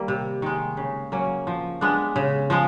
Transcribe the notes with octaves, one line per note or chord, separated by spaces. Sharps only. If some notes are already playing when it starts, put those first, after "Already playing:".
Already playing: D#3 G3 A#3
C3
D#3 G#3
C#3
F#3 A#3 C#4
F3
G#3 B3 D4
C#3
F3 G#3